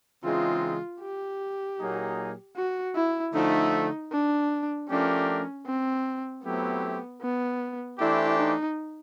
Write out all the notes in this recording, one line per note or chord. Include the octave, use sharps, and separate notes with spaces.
C#3 E3 G#3 C4 D#4 F4
G4
A#2 F#3 A#3 D#4 G#4
F#4
E4
D3 F3 A3 D#4
D4
F3 A3 C#4 D4 G4 A#4
C4
F#3 A3 B3 C4 E4 G4
B3
E3 A3 D4 E4 G4 C5
D#4